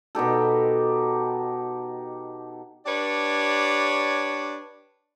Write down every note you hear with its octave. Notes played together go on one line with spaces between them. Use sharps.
B2 D#4 G4 A4
D4 G4 B4 C#5 D5